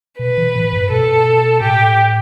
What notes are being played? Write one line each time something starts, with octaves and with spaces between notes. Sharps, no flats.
B2 B4
E3
A2
G2
B2 A4
A2 G4